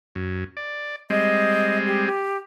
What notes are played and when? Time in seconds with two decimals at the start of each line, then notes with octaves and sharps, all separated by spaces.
0.15 F#2
0.57 D5
1.10 G3 G#3 C4 D#5
1.87 G4
2.07 G4